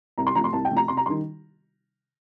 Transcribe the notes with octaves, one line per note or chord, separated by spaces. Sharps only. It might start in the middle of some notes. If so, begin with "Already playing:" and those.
C2 A#5
C6
C3 F3 A3 A#5
C6
C2 A5
G5
C3 F3 A3
A#5
C3 C6
A#5
D#3 G3 C6